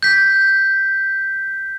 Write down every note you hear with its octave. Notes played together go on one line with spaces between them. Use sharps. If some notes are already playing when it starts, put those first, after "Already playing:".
G6 B6